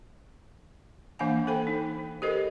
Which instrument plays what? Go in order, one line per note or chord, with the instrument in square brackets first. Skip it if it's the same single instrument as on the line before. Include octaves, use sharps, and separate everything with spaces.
[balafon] E3 A#3 D4 F5 F#5 G#5
A4 C5 G5 B5
D#4
G4 A4 A#4 C5 D#5